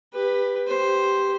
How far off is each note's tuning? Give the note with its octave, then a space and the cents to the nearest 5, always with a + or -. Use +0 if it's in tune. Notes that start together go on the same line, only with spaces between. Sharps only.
G4 +25 B4 +0
G4 +0 C5 +0